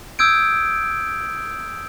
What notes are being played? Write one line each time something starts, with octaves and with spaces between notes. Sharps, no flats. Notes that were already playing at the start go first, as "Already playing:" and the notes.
D#6 E6 G6 G#6 D7